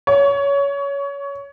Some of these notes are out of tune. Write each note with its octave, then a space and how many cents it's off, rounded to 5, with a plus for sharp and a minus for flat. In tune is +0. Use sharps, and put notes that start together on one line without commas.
C#5 +20